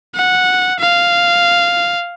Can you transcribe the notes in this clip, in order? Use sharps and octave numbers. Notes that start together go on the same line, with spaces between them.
F#5
F5